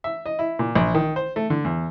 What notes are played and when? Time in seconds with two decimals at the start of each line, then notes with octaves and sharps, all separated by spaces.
0.04 E5
0.26 D#5
0.39 E4
0.59 A#2
0.75 A#1
0.95 D#3
1.16 C5
1.36 A3
1.50 D3
1.64 E2